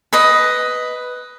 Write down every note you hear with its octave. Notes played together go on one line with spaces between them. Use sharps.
B4 D#5